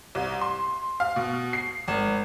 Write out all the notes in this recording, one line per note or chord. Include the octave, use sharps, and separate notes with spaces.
C2
C6
F5
B2
C7
G#1